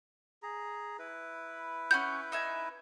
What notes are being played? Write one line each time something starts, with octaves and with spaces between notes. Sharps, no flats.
G#4 A#5
E4 B4
C#4 F#5 G#5 G6
D#4 E5 G#5